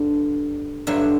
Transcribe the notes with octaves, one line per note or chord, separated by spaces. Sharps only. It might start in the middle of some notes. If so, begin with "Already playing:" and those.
Already playing: G2 D3
G2 D3 F#3 E5